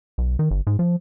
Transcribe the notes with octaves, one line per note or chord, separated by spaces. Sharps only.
B1
D#3
G1
G#2
F3